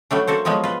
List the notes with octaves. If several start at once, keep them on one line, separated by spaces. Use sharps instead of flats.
F#3 G3 A3 D4
A#3 F#4 A4 C5
F3 F#3 G#3 B3 F4
F4 B4